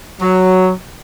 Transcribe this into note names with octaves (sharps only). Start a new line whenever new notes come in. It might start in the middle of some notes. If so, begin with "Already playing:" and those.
F#3